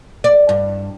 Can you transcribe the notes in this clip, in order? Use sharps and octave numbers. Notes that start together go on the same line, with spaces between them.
D5
G2